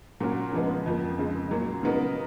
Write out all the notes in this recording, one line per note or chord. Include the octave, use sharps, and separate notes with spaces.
A#2 F#3 C#4 F#4 A#4
C#3 F3 G#3 B3
F2 F3 A#3
F2 C#3 G#3
A#2 F#3 A#3
C#3 F#3 B3 D#4 A#4